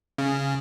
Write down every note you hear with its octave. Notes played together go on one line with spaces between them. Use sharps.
C#3